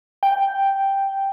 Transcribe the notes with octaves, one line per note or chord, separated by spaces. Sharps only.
G5